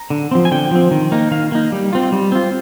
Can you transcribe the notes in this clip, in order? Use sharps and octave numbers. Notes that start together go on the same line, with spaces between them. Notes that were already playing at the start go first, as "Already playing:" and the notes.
Already playing: A#5
D3
F3 C4
G#5
D3 G5
F3 C4
D#3
A#3 D#4
D#3 F5
A#3 D#4
G3
C4 F4
G3
C4 F4